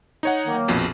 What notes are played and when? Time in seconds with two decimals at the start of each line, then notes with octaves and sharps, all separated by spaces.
0.23 D#4 C#5 F#5
0.46 D#3 F#3 A#3
0.68 A#1 F2 B2